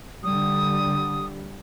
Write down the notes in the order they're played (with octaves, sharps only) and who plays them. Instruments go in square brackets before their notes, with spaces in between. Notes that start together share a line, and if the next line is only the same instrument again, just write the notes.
[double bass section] D3 G3 [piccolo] D#6